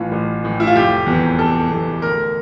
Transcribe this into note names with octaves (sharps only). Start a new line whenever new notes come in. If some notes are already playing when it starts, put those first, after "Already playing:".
Already playing: A1 A2 E3 F4
A1
A2 E3
E4
F4
F1 G4
E2 C3 E3
F1 A4
E2 C3 E3
D2 A#4